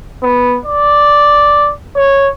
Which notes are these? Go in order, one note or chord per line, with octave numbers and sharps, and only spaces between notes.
B3
D5
C#5